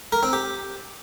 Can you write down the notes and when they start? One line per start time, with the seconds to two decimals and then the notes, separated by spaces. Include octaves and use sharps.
0.12 A#4
0.23 C4
0.33 G4